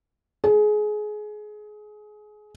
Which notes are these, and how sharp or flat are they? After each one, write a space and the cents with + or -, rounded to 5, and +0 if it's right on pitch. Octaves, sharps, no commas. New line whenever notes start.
G#4 +25